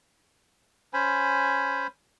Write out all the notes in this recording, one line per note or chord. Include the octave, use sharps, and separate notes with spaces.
C#4 C5 G#5 B5